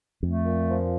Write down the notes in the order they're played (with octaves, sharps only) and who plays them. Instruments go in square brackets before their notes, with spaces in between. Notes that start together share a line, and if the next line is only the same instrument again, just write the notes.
[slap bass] F2 [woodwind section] A3
[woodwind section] A#2
F3